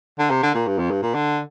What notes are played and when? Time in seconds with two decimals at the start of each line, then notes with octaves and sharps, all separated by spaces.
0.19 D3
0.31 C3
0.43 D3
0.55 A#2
0.67 G2
0.79 F2
0.91 G2
1.03 A#2
1.15 D3